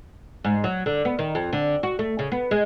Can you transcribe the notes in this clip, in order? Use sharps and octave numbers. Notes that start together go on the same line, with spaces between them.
G#2
F#3
D3
B3
D#3
F2
D3
F#4
A3
C#3
B3
G#3